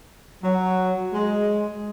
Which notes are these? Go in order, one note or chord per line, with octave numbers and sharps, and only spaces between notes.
F#3
G#3